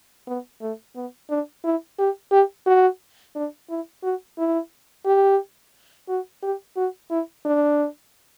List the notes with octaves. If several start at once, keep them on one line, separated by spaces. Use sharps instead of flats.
B3
A3
B3
D4
E4
G4
G4
F#4
D4
E4
F#4
E4
G4
F#4
G4
F#4
E4
D4